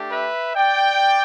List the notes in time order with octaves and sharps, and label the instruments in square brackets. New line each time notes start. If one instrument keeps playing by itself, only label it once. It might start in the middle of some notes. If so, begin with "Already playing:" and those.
Already playing: [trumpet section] A3 D4 G4
B4 E5
D5 G5